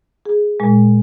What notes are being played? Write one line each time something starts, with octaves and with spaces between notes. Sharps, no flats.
G#4
A#2 G#3